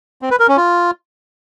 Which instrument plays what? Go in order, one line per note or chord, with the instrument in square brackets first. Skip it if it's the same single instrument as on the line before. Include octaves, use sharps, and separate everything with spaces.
[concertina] C4
B4
A#4
C#4
F4